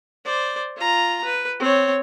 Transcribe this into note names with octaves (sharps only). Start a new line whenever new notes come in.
C5 D5
F4 A#5
B4
C4 C#5